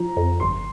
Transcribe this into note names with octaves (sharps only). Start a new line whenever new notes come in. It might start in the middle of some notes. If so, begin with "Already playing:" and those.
Already playing: F3 A#5
F2
G1 C6